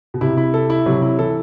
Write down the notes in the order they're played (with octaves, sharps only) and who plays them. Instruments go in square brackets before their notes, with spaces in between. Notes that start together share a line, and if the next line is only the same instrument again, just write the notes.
[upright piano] B2
[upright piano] C3 [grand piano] E4
[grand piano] E4
A4
E4
[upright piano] C3 [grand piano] F#3
[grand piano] E4
[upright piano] E3 [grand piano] A4